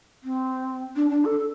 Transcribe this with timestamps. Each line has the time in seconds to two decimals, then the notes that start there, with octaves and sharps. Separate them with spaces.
0.23 C4
0.96 D4
1.10 D4
1.25 A4